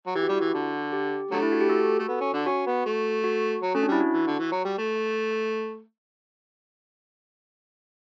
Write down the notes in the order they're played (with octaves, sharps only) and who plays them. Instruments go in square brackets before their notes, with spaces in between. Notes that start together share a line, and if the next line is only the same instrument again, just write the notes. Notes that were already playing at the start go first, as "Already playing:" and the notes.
[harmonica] F#3
[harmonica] E3 [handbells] G4
[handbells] F#4
[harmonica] G3 [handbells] E4
[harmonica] E3 [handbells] F#4
[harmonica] D3
[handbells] G4
[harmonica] D3 F#3 A3 [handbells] D4
[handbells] E4
F#4
G4
F#4 A4
[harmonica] A3
B3
C#4
D3 D4
[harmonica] C#4 [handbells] F#4
[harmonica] B3
A3
[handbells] F#4
[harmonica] F#3
[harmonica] A3 [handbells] C#4
[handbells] D4
[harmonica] G3 [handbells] E4
[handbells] F#4
[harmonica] E3
D3
E3
F#3
G3
A3